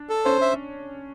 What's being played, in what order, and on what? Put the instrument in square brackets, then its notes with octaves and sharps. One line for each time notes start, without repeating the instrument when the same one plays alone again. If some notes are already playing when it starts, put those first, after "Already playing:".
Already playing: [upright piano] D4
[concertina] A4
[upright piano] C#4 [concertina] C5
[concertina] E5